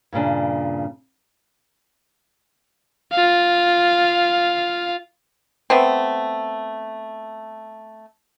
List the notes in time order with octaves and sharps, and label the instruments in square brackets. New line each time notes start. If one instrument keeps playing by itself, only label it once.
[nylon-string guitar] G2 A#2 C#3 D4
[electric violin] F4 F5
[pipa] A3 B3 C4